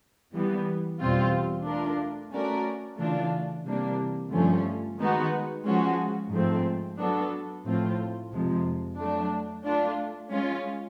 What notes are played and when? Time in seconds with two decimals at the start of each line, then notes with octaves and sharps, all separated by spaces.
0.32 E3 G3 B3
0.99 E2 B2 G3 C4 F4
1.65 A3 D4 F4 A#4
2.32 A3 C#4 F#4 A#4 D5
2.99 C#3 E3 A3 D4 F4
3.65 C3 E3 G3 A#3 D4
4.32 G2 D3 F3 A3 C#4
4.99 D#3 G#3 B3 D#4 F#4
5.65 F3 G#3 C#4 F#4
6.31 G#2 F3 A3 C4
6.98 F#3 B3 D4 F#4 A4
7.65 A2 F3 A3 C4 F4
8.31 F2 C3 F3 G#3
8.98 F#3 A3 D4
9.65 A3 D4 F4
10.31 G#3 C#4 F4